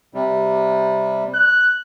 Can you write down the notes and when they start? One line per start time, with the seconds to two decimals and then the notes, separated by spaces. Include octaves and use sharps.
0.14 C3 G3
1.34 F#6